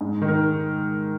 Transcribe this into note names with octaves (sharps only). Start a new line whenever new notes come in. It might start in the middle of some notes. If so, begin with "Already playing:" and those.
G#2
D#3
A#4